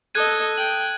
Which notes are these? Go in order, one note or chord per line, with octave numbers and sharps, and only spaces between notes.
A4 D#5 F#6 G#6 D#7
G5 F#7